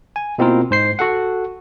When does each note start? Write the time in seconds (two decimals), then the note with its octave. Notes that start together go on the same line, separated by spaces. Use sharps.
0.16 G#5
0.38 B2 A#3 C4 E4 F4 A#4
0.71 G#2 C5 C7
0.99 F#4 A4 F#5